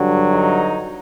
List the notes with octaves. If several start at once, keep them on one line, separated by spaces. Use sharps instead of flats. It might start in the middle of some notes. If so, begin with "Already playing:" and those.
Already playing: G2 D3 F#3
D#4